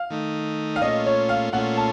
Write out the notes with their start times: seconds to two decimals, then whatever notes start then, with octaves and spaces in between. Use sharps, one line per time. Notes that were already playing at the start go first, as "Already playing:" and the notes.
Already playing: F5
0.10 D#3 A3 D#4
0.76 F5
0.81 A#2 A3 C#4 F4 D#5
1.06 C#5
1.29 F5
1.53 A#2 A3 C#4 F4 F#5
1.77 A5